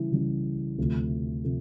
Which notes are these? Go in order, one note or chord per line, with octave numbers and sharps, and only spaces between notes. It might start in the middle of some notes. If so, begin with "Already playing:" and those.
Already playing: C#3 E3 G3
C#3 E3 G3
D2 C3 F3 A3
C3 F3 A3